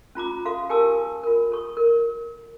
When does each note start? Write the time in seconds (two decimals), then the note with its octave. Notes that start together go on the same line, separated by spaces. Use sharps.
0.15 C#4 F4 A#5 D6
0.45 F#4 A4 F5
0.69 G4 A#4 G#5 A5 D6 E6
1.23 F4 A#4
1.52 A4 C#6
1.77 A#4